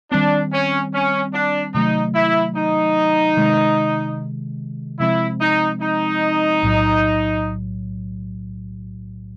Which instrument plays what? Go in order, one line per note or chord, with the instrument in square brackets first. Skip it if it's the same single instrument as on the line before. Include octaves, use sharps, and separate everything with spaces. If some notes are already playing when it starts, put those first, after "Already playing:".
[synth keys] D#3 G3 C4 [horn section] D4
[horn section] C#4
C#4
D4
[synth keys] C3 D#3 F#3 A3 [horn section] D#4
[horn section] E4
D#4
[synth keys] C3 D#3 G#3
[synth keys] C3 F3 G#3 C4 [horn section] E4
[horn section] D#4
D#4
[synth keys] B1 A2 F#3